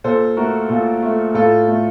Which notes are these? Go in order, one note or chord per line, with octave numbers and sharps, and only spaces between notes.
A#2 A4 C5
A3 F#4 A#4
A#2 F4 A4
A3
A2 F4 A4
A3